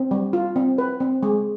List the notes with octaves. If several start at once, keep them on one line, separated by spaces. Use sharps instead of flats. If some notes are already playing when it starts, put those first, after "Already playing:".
Already playing: C4
G3
F4
C4
B4
C4
G#3